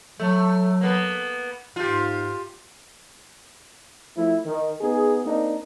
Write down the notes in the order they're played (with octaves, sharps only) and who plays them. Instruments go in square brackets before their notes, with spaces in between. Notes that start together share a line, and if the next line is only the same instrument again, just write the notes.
[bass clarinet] F#3 [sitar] A3
[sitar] A#3 B3
[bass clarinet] G#2 [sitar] F4 G4
[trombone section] F3 A3 E4
D#3
B3 D#4 G#4
A#3 C4 D4 D#4